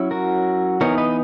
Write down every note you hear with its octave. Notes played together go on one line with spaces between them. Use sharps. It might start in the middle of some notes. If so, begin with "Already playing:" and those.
Already playing: F#3 C#4 E4
F#4 A#4
E3 B3 D#4 A#4 C#5
B4 D#5